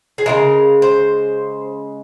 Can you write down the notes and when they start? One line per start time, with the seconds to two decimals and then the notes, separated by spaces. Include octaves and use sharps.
0.18 G#4
0.26 C#3 F3 G#3 A#4
0.82 C5